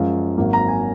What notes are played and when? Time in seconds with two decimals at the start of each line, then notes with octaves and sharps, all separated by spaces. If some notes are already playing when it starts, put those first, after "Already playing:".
Already playing: F#2 F3 G#3 F5
0.37 G#1 G#2 F#3 A#3
0.53 A#5
0.68 G#5